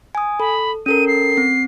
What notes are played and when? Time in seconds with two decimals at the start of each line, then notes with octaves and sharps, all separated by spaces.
0.15 G#5 D#6
0.40 A4 B5
0.86 C#4 A4 A#4 D#7
1.07 C7
1.37 C4